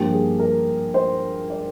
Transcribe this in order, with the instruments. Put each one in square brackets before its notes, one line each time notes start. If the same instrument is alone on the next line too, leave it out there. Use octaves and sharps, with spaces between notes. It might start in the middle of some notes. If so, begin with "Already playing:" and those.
Already playing: [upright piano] G2 F3 A#3 G4
G#4
A#4
C5
D5